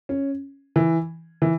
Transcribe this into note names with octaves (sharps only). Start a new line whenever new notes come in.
C#4
E3
E3